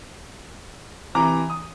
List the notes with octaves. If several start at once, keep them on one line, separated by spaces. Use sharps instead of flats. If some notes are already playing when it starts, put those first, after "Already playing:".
C3 E3 A#5 D6
D#6